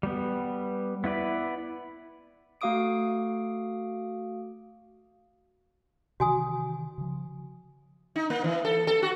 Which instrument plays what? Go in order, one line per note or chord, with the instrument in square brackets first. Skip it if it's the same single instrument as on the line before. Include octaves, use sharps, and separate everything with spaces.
[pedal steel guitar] G3 B3
B3 E4 B4 D5
[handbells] A3 F#4 F5 D6 D#6 D7
[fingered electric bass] C3 D#3 E3 [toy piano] F#4 G#5 D#6
[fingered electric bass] C#3 F3
[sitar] D#4
A#3
E3
A4
A4
F#4